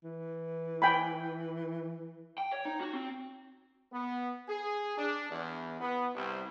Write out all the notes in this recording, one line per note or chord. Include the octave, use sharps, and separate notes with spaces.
E3
G5 G#5 B5
G5
C#5
D#4
F#4
C4
B3
G#4
D4
E2
B3
C2